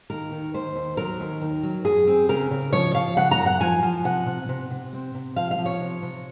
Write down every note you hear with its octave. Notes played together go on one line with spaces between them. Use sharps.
D#2 A#4
D#3
D#2 C5
D#2
F#3 A#4
D#2
D#3
F#3
F#2 G#4
C4
C#3 A#4
C#3
F3 C#5
F3 F5
C#3 F#5
A#5
F#2
F#5
F3 G#5
F3
C3 F#5
C3
C3
C3
C4
C3
F3 F5
F5
F3
C#5
C3
C3